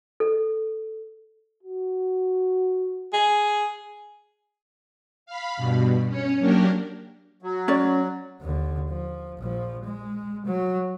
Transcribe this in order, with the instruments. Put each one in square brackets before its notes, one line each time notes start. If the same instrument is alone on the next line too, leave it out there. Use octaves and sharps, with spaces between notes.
[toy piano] A4
[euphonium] F#4
[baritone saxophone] G#4
[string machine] F5 B5
G2 B2
C#4 C#5
F#3 A#3 D4 G4 A#4
[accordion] F#3
[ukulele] C#4 D5
[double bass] D#2 D3
F3
A#1 F3
G#3
F#3